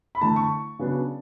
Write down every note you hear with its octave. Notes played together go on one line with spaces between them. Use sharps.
B5
D3 A3 E4 A5
C#6
C#3 F#3 B3 D4